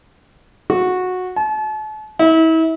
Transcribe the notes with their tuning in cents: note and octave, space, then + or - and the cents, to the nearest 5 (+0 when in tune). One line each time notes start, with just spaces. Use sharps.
F#4 -15
A5 -40
E4 -35